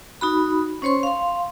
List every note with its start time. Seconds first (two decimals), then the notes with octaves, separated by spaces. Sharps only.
0.21 D#4 F#4 B5
0.82 C#4 C5 C#5 C6 C#6
1.03 F5 C6